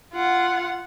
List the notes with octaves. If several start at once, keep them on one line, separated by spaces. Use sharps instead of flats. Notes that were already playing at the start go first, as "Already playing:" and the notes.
F4 F#5